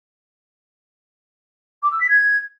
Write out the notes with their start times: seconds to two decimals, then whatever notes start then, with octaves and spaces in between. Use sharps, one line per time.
1.82 D6
1.91 E6
2.00 B6
2.09 G#6